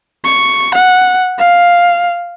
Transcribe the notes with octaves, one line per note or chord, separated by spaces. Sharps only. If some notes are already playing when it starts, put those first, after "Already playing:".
C#6
F#5
F5